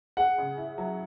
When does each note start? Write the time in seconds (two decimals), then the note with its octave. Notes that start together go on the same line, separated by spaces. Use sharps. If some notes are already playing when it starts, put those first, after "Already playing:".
0.17 G#4 F#5
0.38 C#3
0.57 E4
0.78 F#3